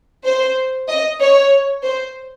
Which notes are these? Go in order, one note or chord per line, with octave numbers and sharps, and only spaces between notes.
C5
D#5
C#5
C5